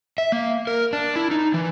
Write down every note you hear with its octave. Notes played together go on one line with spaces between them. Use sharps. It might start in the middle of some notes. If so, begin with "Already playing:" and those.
E5
A#3
A#4
D4
E4
D#4
E3